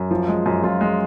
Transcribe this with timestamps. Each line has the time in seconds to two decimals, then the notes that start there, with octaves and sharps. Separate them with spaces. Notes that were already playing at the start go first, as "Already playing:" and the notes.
Already playing: F#2
0.11 F3
0.28 G#3
0.46 F#2
0.63 F#2 F4
0.81 G#3